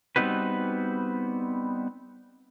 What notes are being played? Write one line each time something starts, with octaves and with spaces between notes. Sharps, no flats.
G3 B3 C4 D#4 F#4 B4